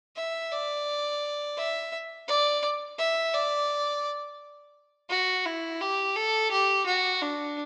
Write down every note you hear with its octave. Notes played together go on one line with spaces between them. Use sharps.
E5
D5
E5
D5
E5
D5
F#4
E4
G4
A4
G4
F#4
D4